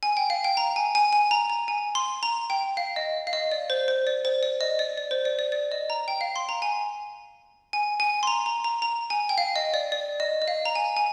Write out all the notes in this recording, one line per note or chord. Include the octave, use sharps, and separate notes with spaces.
G#5
G5
F5
G5
A#5
G#5
G#5
G#5
A#5
A#5
G#5
C6
A#5
G5
F5
D#5
F5
D#5
D5
C5
C5
D5
C5
D5
D#5
D5
D5
C5
D5
D5
D5
D#5
A#5
G5
F5
C6
A#5
G#5
G#5
G#5
C6
A#5
A#5
A#5
A#5
G#5
G5
F5
D#5
D5
D5
D#5
D#5
F5
A#5
G#5
G#5